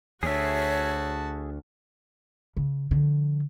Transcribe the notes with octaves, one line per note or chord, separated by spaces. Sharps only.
D2 F#4 G#4 C#5 E5 A5
C#3
D3 F3